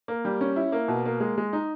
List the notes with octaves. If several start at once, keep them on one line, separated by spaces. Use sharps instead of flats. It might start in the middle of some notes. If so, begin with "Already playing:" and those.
A#3
G3
C#4
E4
A#3
B2
A#3
G#3
G#3
D#4